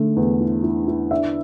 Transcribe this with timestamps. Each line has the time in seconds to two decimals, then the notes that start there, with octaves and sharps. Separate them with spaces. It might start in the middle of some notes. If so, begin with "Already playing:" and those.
Already playing: D3 A3
0.17 E2
0.40 E4
0.64 E4
0.88 E4
1.11 D4 E5